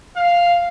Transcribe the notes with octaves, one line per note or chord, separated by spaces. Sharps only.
F5